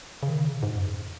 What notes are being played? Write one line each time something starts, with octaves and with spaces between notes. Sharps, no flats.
C#3
D#3
C#3
B2
G#2
F#2
F2